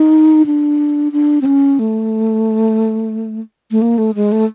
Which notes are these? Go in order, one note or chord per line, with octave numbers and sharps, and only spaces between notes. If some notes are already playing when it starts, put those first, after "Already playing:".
Already playing: D#4
D4
D4
C4
C#4
A3
A3
A#3
A3
G#3
A3